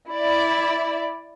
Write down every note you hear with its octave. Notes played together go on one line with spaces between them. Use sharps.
E4 D5